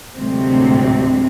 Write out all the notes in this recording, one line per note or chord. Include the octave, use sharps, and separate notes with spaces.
D2 A2 C3 F#3 G#3 C4